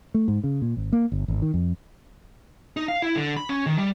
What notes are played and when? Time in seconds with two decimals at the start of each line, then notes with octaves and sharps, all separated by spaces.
0.14 A3
0.28 G#2
0.44 C#3
0.62 A#2
0.77 G#1
0.92 A#3
1.12 G1
1.28 G#1
1.42 D#3
1.54 F2
2.77 D#4
2.88 F5
3.02 E4
3.16 D3
3.37 B5
3.49 C#4
3.66 D#3
3.78 G3